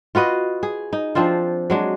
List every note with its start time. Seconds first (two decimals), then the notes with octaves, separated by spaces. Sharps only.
0.15 F4 F#4 B4 D#5
0.63 G#4
0.93 D#4
1.15 F3 C4 D4 F4
1.70 F#3 G#3 D4